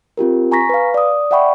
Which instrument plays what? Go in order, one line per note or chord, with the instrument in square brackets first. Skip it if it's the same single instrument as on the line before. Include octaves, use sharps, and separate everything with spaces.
[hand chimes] C4 F4 G4 A#4
G#5 A#5 C#6 A#6 B6
B4 F5
D5 D#6
D5 E5 F#5 G5 B5 C#6